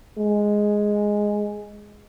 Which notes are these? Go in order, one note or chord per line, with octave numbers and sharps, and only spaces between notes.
G#3